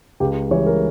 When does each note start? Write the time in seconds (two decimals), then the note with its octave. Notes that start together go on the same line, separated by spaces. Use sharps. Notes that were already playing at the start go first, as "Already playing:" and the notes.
0.20 C#2 G4
0.51 C#3 E3 G3 C#5
0.67 A#4